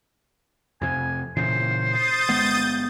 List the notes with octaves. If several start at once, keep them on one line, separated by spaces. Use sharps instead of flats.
F2 C3 G#5
A#2 C#3 E3 C5
D#6 G6 A6
G1 G#3 B3